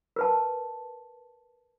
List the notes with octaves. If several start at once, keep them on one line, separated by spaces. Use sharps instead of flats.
A#4 B4 A5